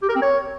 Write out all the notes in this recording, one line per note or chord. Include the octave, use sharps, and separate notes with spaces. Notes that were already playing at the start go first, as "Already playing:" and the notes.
G4
A#4
C4
C#5